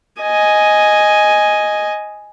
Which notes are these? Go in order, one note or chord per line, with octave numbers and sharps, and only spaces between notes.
D#5 G#5